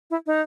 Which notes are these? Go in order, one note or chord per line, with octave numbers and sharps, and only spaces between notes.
E4
D#4